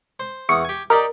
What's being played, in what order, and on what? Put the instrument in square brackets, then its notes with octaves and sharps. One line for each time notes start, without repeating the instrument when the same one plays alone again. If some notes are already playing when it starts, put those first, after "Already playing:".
[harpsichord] C5
[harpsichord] E2 D#6 [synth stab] C#6
[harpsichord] G4 G#5
[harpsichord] D#4 G4 D5 [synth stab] A#4